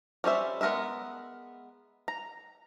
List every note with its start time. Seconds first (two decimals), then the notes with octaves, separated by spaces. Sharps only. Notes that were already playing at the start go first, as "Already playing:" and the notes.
0.24 G3 C#4 C5 E5
0.61 G#3 B3 A#4 B4 E5
2.08 A#5